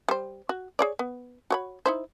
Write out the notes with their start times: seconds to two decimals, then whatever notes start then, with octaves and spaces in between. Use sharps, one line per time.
0.08 G3 C5
0.49 F#4
0.79 G#4 C#5 D5
0.99 B3
1.50 F#4 C#5 B5
1.86 D#4 E4 C5